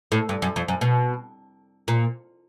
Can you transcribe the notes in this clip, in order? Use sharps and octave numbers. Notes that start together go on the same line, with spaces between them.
A2
G2
F#2
F2
F#2
B2
A#2